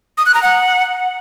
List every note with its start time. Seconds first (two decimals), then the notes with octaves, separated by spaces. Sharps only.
0.18 D#6
0.26 F#6
0.34 A#5
0.43 F#5